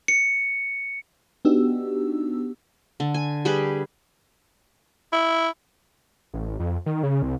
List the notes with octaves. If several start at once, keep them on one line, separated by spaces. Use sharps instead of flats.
C#7
B3 D4 D#4 F#4 G4 E6
D3
G#5
G3 G4 G#4 B4
E4
A1
F2
D#3
C#3
C2